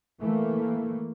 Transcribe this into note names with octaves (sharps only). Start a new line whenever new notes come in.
E3 A3 A#3